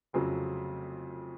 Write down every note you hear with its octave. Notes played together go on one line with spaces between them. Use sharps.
F1 F2 C#3 F#3